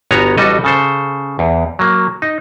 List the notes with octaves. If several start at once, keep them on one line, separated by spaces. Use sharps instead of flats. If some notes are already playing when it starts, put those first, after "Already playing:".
G1 B3 F#4 C#5 G#5 A#5
A1 G3 F#4 A4 D#5
C#3 A4 C5
E2
F#3 A#3
D#4